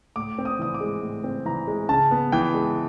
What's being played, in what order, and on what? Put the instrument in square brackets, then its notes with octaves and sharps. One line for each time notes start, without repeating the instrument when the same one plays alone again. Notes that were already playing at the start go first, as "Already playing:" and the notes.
[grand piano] A2 D6
C4
D#6
E3 D#6
D6
G#3
A2
C4
E3 A#5
G#3
C#3 A5
B3
E3 G5
G#3